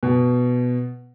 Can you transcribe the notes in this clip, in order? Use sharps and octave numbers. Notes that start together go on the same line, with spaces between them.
B2